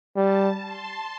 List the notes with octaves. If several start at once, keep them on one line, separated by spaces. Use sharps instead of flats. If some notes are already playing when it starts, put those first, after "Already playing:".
G3 A5
C6